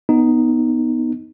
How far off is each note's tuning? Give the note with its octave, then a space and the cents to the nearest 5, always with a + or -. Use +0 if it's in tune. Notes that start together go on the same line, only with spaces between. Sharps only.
B3 +0 D#4 +0